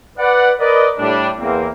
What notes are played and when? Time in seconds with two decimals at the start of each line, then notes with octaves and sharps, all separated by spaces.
0.18 B4 D5 F#5
0.59 A#4 B4 D5 D#5
0.98 A2 G3 D4
1.39 E2 A#3 C4